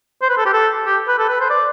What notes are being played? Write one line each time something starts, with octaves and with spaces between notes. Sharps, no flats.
C5
B4
A4
G4
A4
G4
B4
A4
B4
C5
D5